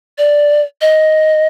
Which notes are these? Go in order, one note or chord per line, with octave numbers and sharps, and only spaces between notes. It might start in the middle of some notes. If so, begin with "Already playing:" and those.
D5
D#5